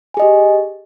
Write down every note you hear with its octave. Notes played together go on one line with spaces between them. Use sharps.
G4 G#4 D#5 G#5